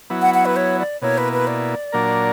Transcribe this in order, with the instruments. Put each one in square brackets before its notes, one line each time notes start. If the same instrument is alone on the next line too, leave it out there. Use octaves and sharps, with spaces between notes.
[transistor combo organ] F#3 B3 E4
[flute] F#5
F#5
B4
C#5
D5
[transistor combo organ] B2 A#3 E4 [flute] C#5
[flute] B4
B4
D5
[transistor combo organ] A#2 F#3 A#3 D4 A#4